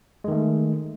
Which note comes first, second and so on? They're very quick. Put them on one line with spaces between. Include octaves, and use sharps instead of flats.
G#3 D#3 A3